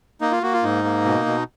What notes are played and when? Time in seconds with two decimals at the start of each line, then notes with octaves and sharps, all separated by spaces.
0.21 A#3 D#4
0.32 F4
0.42 A#3 F#4
0.53 F4
0.63 G#2 D#4
0.84 A#3
1.05 B2
1.26 B2